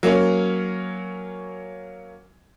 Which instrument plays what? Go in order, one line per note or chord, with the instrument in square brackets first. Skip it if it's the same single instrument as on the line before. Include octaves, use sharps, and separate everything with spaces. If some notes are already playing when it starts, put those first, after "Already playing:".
[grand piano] F#3 A#3 C#4